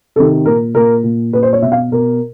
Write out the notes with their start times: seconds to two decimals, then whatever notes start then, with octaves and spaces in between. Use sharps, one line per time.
0.16 C3 D#3 A4
0.45 A#2 A#4
0.75 A#2 A#4
1.03 A#2
1.33 A#2 B4
1.43 C5
1.53 C#5
1.62 B2 E5
1.72 F5
1.91 B2 A#4